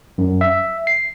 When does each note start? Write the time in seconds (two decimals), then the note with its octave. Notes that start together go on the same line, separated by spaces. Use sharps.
0.18 F#2
0.41 E5
0.87 C7